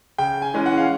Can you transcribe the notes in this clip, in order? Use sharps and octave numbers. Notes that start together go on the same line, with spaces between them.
C#3 G5
G#5
E3 G#3 C#4
F#5
F5